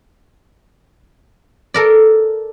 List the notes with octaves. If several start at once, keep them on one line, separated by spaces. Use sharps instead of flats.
A4 A#4 D5